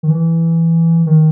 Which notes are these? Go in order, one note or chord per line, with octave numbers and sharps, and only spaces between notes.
D#3
E3
D#3